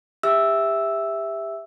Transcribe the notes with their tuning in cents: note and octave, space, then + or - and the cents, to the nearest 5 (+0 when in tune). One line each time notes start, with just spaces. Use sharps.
G4 +30 E5 +0 E6 +0